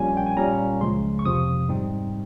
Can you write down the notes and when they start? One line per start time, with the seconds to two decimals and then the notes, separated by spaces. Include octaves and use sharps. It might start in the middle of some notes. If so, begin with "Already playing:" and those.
Already playing: A#1 A#2 G3 C#4 G#5
0.17 G5
0.27 G#5
0.37 A#2 G3 C#4 A#5
0.81 C#2 C#3 F3 G#3 C6
1.19 C#6
1.25 F2 C3 F3 C4 D#6
1.69 G#2 G3 C4 D#4